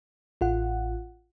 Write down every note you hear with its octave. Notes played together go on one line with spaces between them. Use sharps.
A1 F4 F#5